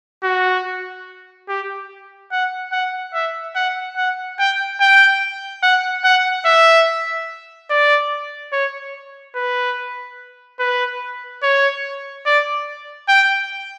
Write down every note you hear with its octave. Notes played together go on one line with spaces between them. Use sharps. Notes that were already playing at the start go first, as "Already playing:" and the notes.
F#4
G4
F#5
F#5
E5
F#5
F#5
G5
G5
F#5
F#5
E5
D5
C#5
B4
B4
C#5
D5
G5